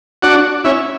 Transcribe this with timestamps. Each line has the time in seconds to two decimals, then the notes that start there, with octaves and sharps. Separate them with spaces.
0.22 D4 F#4
0.64 C#4 E4